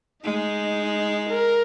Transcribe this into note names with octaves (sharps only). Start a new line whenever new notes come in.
G#3 D#4
A#4